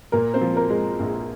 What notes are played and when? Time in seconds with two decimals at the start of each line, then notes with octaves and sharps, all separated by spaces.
0.12 A#2 A#3 A#4
0.34 C4 C5
0.41 F3
0.56 A#3 A#4
0.70 G#3
1.00 A#1